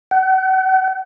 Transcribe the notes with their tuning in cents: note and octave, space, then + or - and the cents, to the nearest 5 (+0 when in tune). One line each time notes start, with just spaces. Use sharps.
F#5 +35